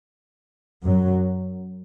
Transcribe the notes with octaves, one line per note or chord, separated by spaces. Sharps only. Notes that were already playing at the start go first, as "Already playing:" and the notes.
F#2 F#3